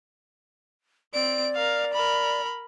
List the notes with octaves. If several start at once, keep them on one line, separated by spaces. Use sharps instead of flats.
C4 D5 D7
A#4 F5
A#4 B5